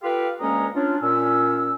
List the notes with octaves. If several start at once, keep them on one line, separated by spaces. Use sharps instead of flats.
F4 G4 A4 B4 F5 G5
D2 G#3 A#3 C#4 D#5 A#5
C#4 D4 F4
A#2 C#4 E6